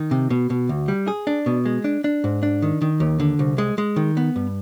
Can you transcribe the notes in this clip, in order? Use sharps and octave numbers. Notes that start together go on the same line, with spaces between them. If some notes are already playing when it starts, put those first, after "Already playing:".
Already playing: D#3
C3
B2
B2
D2
G3
G#4
D4
B2
G#3
D4
D4
G#2
D4
D#3
D#3
D#2
D3
C2
G#3
G#3
D#3
B3
G2